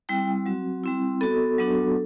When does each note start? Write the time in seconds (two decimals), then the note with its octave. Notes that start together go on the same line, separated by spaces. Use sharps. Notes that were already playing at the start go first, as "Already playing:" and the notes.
0.09 G3 C4 E4 G5
0.46 F#3 C4 F#4
0.84 G3 C4 E4
1.21 B3 F#4 A4
1.58 F#3 B3 D4 F#4